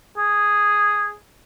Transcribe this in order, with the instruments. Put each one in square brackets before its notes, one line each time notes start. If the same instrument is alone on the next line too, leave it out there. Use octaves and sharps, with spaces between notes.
[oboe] G#4